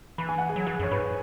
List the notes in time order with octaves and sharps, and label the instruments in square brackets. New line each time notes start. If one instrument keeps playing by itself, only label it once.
[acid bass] E3 [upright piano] B5
[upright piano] G#5
F#5
G#4 G#5
[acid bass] F#3
[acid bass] E3 [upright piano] G#4 G#5
[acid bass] F#2 [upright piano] C#5
[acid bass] G#2 [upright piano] B4